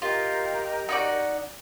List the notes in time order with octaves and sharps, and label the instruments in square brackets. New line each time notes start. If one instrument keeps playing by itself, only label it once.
[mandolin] F4 [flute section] G4 A#4 D#5
[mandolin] D#4 F#4 D5